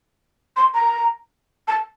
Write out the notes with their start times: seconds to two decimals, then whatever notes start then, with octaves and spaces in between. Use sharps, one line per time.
0.57 C6
0.74 A#5
1.68 A5